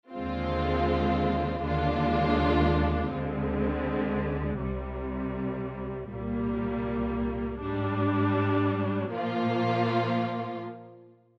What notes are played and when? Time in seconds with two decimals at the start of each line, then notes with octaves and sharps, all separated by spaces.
0.12 D#2 D3 G#3 C4 F4
1.63 D#2 D3 G#3 D4 F4
3.12 D2 D3 G#3 C4
4.62 C2 C3 G3
6.11 C2 A#2 G3 A#3
7.61 G#2 G3 D4
9.11 A#2 F3 A#3 F4